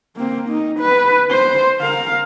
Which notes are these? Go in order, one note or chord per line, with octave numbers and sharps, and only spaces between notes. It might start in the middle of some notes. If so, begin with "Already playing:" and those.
A#3 C4
D#4
B4
C5
A#4 F5